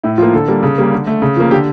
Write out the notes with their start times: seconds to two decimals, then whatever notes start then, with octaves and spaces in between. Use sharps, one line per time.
0.03 A2 E4
0.18 F3 A#3 F4
0.34 D3 A4
0.48 G3 A#3
0.63 C#3
0.78 G3 A#3
0.92 D3
1.07 A3
1.22 C#3
1.37 F3 A#3
1.51 D3 G4